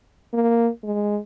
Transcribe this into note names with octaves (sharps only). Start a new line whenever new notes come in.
A#3
G#3